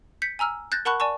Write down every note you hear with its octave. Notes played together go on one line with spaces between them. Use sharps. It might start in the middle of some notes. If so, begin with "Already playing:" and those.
G6 B6 C#7
G#5 A#5 E6 F6
F#6 G6 A6 A#6
A#4 F#5 A5 B5 C#6 F#6
D5 G#5 A5 C#6